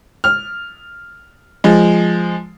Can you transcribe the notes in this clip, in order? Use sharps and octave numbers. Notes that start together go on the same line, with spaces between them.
F6
F3 G#3